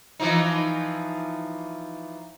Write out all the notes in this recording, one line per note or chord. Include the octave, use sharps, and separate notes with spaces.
E3 F3 D#4